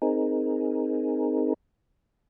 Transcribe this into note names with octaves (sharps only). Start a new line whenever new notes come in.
C4 D#4 G#4 A#4